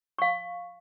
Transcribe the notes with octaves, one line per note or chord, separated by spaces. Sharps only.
F5 C#6